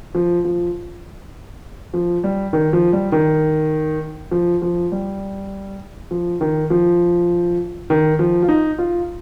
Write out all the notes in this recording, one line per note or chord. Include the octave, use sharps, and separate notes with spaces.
F3
F3
F3
G3
D#3
F3
G3
D#3
F3
F3
G3
F3
D#3
F3
D#3
F3
F4
D#4
F4